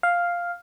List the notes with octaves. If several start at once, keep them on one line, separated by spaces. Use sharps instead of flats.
F5